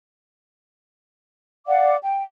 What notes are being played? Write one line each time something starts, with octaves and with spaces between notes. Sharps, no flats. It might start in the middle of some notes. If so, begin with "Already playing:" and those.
D5 F5 F#5 D6
G5